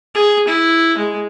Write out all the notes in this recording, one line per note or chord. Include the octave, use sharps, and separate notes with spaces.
G#4
E4
G#3